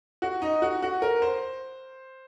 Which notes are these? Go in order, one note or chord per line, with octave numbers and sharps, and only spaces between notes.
F#4
D#4
F#4
F#4
A#4
C5